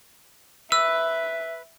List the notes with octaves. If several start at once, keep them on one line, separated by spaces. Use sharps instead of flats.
B4 E5 E6